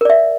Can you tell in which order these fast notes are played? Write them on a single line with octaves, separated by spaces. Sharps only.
A#4 D5 E5